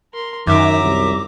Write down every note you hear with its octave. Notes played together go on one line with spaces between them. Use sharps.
A#4 C6
F#2 D#3 E5 A#5 D6
C2